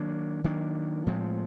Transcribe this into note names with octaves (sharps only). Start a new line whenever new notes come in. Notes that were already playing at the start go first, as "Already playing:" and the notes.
Already playing: D#3 F#3 A#3 D4
D#3 F#3 A#3 D4
A2 F3 G#3 C4